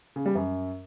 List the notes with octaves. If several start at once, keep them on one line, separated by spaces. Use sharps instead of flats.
C#3
G3
F#2